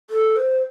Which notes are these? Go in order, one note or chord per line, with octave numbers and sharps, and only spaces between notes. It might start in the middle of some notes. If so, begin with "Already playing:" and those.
A4
C5